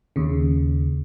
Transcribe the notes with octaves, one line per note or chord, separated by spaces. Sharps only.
D#2 C#3